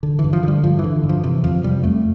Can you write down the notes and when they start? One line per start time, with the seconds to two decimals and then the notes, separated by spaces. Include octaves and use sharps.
0.03 D3
0.19 E3
0.24 G2
0.33 F3
0.43 D3
0.48 G3
0.63 G2 F3
0.79 E3
0.84 D3
1.03 G2
1.09 F3
1.23 C3 E3
1.44 F2 F3
1.63 C3 G3
1.83 F2 A3